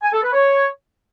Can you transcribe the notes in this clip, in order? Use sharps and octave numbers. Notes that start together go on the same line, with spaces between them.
G#5
A4
B4
C#5